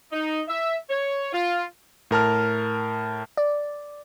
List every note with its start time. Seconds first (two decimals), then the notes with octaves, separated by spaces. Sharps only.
0.12 D#4
0.48 E5
0.89 C#5
1.33 F4
2.11 A2 A#4 A5 F6
3.37 D5